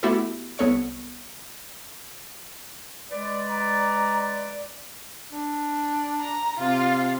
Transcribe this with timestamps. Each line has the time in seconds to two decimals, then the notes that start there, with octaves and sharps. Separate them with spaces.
0.03 A3 B3 E4 F#4 G4 A4
0.58 C2 B3 A4 C#5 C#6 C#7
3.11 G#3 B4 D5
3.49 A#5
5.32 D4
6.20 A#5
6.59 C3 F4